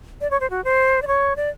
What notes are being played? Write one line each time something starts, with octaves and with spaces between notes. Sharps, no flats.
D5
C#5
C5
F#4
C5
D5
C#5
D5